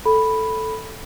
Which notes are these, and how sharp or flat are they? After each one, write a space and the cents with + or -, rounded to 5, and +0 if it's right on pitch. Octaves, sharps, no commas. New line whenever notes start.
A4 +0 B5 +0